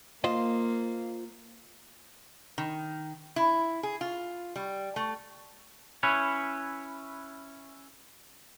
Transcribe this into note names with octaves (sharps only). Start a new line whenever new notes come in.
A#3 F4 C5 D#5
D#3
E4
G#4
F4
G3
A3
C#4 E4 B4 C#5